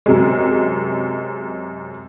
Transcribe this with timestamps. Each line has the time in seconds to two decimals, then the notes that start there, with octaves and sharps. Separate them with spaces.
0.06 F#2 C3 G#3